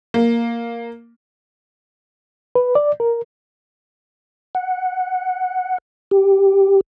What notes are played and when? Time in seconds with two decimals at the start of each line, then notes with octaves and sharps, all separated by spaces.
0.14 A#3
2.55 B4
2.75 D5
3.00 A#4
4.55 F#5
6.11 G4